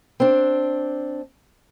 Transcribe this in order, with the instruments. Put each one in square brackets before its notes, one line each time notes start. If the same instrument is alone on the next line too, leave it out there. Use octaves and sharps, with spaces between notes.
[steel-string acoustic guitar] C4 D4